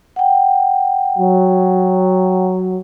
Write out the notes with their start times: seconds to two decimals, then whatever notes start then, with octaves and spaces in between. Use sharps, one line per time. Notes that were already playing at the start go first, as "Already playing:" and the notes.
0.16 F#5 G5
1.18 F#3